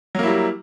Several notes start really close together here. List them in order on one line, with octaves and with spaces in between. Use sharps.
F#3 A#3 E4 G3